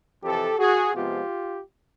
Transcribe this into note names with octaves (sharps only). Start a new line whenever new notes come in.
F2 C3 E3 G4 A4
F#4 G#4
C3 F3 G#3 B3 F4 G4